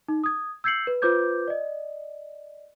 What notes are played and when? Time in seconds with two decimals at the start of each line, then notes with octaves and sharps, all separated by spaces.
0.09 D#4
0.24 D#6 G#6
0.64 E6 G6 G#6 C7 C#7 F#7
0.87 B4
1.02 F4 B4 C5 D6 G6 G#6
1.48 D5 D#5